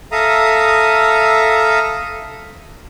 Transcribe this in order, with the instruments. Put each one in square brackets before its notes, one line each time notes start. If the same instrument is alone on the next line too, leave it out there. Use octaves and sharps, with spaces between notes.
[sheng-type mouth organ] A4 E5 F5 A#5 D#6